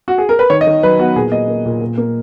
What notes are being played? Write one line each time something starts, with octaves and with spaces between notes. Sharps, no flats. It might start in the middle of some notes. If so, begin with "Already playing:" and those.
F#4
G#4
A#4
B4
D#3 C#5
D#5
D#3
F#3 B4
B3 F#4
A#2 G#4
A#3 D#5
A#3
A#2
A#2
A#3